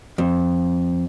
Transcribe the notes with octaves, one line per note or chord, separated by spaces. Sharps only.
F2